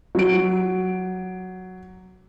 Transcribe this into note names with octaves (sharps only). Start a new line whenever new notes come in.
F#3 D7